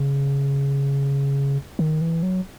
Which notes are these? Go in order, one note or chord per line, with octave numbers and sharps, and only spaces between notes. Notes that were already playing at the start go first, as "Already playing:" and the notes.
Already playing: C#3
D#3
E3
F#3